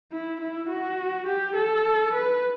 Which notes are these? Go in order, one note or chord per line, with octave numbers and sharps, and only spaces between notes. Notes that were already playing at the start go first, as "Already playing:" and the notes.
E4
E4
F#4
G4
A4
B4